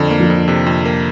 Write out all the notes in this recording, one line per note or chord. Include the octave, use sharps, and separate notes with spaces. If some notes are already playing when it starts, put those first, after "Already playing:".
Already playing: F2 D3
A#3
F3
F2
C3
F2
A#3